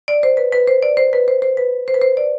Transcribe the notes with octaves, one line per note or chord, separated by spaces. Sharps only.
D5
C5
B4
B4
C5
D5
C5
B4
C5
C5
B4
C5
B4
C5
D5